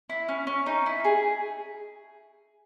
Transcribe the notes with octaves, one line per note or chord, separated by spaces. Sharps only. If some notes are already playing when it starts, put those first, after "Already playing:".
E4
C#4
C#4
D#4
E4
G#4